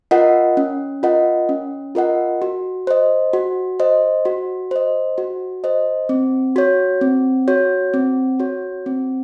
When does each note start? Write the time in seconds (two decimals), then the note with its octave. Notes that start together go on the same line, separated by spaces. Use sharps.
0.11 F4 A#4 D#5 F#5
0.57 C#4
1.03 F4 A#4 D#5 F#5
1.49 C#4
1.95 F4 A#4 D#5 F#5
2.42 F#4
2.87 C5 D#5
3.33 F#4
3.80 C5 D#5
4.25 F#4
4.71 C5 D#5
5.18 F#4
5.64 C5 D#5
6.09 C4
6.56 F#4 C#5
7.01 C4
7.48 F#4 C#5
7.94 C4
8.40 F#4 C#5
8.86 C4